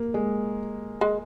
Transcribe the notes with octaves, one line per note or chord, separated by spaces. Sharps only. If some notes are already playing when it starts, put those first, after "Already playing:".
Already playing: A#3
G#3
G#3